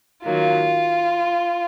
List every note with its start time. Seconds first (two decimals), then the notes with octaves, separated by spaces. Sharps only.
0.24 D#3 F#3 A#3 F4